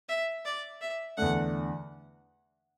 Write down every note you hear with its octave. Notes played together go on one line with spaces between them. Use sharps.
E5
D5
E5
E2 D3 A3 D4 F#5